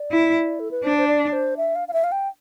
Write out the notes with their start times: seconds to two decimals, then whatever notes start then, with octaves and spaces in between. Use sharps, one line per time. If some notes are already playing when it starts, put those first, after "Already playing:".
Already playing: D5
0.12 E4
0.60 A4
0.71 B4
0.84 D4 C5
0.98 C5
1.08 D5
1.33 C5
1.57 E5
1.76 F5
1.88 F5
1.93 E5
2.04 F5
2.12 G5